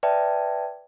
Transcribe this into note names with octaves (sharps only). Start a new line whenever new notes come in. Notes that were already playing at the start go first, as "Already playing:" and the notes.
B4 D5 E5 G5 A5